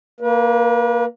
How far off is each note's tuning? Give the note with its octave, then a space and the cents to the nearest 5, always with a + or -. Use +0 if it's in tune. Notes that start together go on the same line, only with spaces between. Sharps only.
A#3 +0 B4 -35